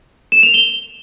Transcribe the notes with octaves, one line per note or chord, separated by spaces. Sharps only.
E7
F7
G7